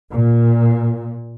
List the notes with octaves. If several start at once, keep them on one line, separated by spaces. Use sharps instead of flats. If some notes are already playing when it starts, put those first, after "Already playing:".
A#2